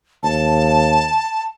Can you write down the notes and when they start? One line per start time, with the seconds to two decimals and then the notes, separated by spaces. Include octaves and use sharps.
0.23 D#2 A5